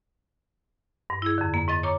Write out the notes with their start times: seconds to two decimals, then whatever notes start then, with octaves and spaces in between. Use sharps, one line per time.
1.10 G2
1.22 E4 G#4
1.38 F2 D3
1.54 A#3
1.68 G#2 D#5 A6
1.83 C#5 A#5 C#6 D6